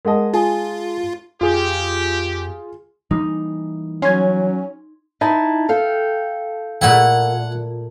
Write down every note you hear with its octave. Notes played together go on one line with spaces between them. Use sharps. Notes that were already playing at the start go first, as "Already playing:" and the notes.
G#3 A#4 D#5 F#5 A5
F4 G#4 A5
F2 F4 G4 G#4
E3 G3 A#3 D#4
F#3 C#4 C6 G#6
D#4 E4 A5
A4 F5 G5
A#2 A3 E4 F#5